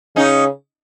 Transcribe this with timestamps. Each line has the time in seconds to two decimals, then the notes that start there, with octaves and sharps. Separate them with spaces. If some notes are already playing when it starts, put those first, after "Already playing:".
0.16 C#3 C#4 D#4